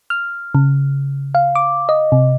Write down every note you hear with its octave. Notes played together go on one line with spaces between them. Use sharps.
F6
C#3
F5
D6
D#5
C3